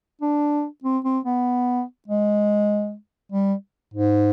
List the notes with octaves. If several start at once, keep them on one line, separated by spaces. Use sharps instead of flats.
D4
C4
C4
B3
G#3
G3
G#2